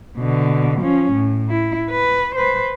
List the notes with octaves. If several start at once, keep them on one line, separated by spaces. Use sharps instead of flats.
B2 D3
F3 C#4
A2
E4
B4
B4 C5